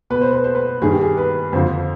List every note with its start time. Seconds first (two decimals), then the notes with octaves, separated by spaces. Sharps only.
0.10 B2 B4
0.21 C5
0.33 B4
0.44 C5
0.55 B4
0.82 G2 D#3 G#4
0.92 G4
1.01 G#4
1.17 B4
1.53 F2 D3 F3 C5